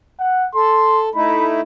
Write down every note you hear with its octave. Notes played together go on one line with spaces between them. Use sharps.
F#5
A4 C6
A3 D#4 E4 B5